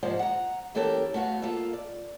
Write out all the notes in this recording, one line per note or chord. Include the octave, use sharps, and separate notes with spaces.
G#2 C3 F3 A#3 D4
F#5 A#5
E3 A#3 C#4 G4 A4 A#4
A3 B3 F#4 F5
A#3 F4 A4 E5
D5